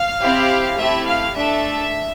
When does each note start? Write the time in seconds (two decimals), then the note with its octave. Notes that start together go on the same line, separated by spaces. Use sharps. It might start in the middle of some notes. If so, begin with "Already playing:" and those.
Already playing: F5
0.20 C4 E4 G4
0.77 A3 C4 E4 G4 E5
1.06 F5
1.35 A3 D4 A4 E5